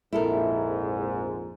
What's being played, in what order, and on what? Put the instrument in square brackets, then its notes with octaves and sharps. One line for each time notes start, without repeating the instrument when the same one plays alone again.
[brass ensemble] A#1 F2 G#2 [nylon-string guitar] E4 A4 A#4